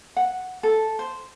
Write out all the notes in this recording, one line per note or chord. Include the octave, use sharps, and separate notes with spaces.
F#5
A4
C5